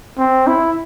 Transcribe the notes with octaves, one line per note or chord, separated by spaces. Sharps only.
C4
E4